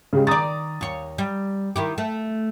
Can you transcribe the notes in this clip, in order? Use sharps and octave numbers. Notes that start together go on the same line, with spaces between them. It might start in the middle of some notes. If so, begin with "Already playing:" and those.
C#3 G#3 G4
D#3 D5 A#5 D#6 A6
D#2 C#5
G3
D#3 E4 G4
A3